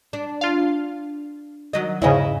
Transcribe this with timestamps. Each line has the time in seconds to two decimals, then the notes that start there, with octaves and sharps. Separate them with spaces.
0.13 D4
0.41 F4 F5
1.73 D#3 F#3 D#5
2.02 E2 G#2 C#3 E4 C#5 D#5